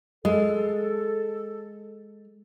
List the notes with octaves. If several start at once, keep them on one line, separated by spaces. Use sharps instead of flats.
G#3 A4